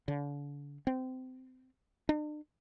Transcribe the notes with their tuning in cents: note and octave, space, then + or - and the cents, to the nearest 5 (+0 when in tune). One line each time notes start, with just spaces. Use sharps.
D3 -40
C4 -25
D4 +45